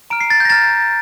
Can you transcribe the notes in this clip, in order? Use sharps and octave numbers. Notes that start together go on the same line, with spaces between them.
A#5 F6 D7
C7
A6
G6
A#6
A#5 F6 A6